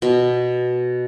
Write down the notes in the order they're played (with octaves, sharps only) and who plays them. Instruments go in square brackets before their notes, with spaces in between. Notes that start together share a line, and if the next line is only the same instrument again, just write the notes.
[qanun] B2